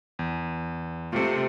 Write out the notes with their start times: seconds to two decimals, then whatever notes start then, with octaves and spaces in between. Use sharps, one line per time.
0.19 E2
1.13 C3 A3 F4